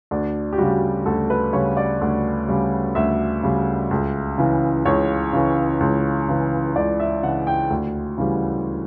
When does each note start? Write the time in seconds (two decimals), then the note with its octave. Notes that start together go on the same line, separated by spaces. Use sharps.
0.11 D2 D4
0.53 G4
0.58 C#3 G3 F#4
1.06 D2 A4
1.30 B4
1.53 C#3 G3 C#5
1.77 D5
2.01 D2
2.48 C#3 G3
2.95 D2 E5
3.43 C#3 G3
3.91 C#2
4.38 C#3 E3
4.85 C#2 C#5
5.33 C#3 E3
5.80 C#2
6.28 C#3 E3
6.76 C#2 D5
7.00 E5
7.23 C#3 E3 F#5
7.47 G5
7.70 D2
8.18 C#3 E3 G3